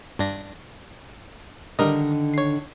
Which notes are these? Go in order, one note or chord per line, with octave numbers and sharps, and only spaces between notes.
G2 D4 A#6
D3 D#3 G3 A#4 D#5
C#5 C7